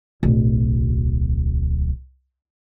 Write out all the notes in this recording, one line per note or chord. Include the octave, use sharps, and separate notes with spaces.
D1 B1